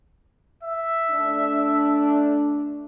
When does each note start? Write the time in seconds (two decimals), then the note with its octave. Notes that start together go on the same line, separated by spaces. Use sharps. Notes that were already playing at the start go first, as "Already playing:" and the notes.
0.64 E5
1.10 A3 D4